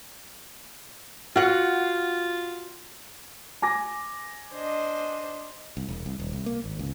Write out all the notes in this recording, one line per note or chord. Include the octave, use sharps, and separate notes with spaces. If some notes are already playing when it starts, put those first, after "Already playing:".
F4 F#4 F#5
G#5 D6 A#6
D4 C5 D#5
C2
E1
C2
D#1
C2
A#3
G#1
C#2